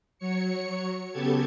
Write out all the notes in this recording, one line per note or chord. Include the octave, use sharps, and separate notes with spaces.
F#3 C#5 C#7
C#3 B3 G4 A4 A5 G#6